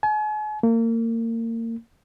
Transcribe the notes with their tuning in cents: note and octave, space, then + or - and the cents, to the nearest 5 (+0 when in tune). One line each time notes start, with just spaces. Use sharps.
G#5 +40
A#3 -30